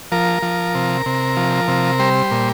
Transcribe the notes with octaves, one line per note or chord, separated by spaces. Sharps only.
F3 A#4
F3
C3
C3
F3
C3
G3 C5
A#2